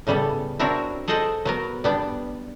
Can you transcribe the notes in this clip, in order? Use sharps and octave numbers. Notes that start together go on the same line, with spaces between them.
A2 C#3 G3 B3 A4
C4 D4 E4 F#4 A#4 C#5
G#4 A4 C5 D#5 F#5 G5
F#3 B3 A#4
G3 B3 D4